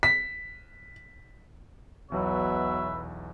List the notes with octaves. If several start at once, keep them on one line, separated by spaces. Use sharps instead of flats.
B6
B1 E2 B2 F#3 B4 C#5 E5